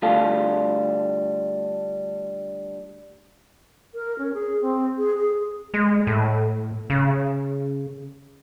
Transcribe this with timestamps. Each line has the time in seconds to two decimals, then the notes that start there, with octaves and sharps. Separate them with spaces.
0.02 D3 G3 A3 F4 A4 F5
3.94 A#4
4.18 C#4
4.34 G#4
4.61 C4
4.98 G#4
5.15 G#4
5.74 G#3
6.07 A2
6.90 C#3